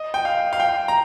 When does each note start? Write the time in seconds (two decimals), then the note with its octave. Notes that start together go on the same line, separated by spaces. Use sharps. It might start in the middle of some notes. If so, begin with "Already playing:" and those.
Already playing: D#5
0.14 G5
0.25 F5
0.53 F5
0.60 G5
0.88 A#5